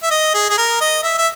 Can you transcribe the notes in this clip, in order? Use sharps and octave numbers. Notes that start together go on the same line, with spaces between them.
E5
D#5
G#4
G#4
A#4
D#5
E5
E5